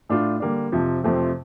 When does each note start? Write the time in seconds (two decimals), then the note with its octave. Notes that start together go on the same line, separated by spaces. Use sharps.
0.09 A2 A3 D4 F4
0.40 D3 G3 A#3 D4
0.72 F2 C3 F3 C4
1.04 F2 C3 F3 A3 C4